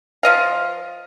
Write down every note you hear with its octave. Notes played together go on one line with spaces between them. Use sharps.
F3 D#5 F5